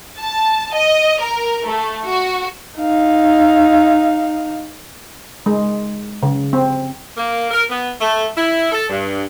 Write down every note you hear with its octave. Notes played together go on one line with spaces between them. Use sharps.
A5
D#5
A#4
A3
F#4
D#4 F5
G#3
C#3
C4
A#3
A#4
B3
A3
E4
A4
G2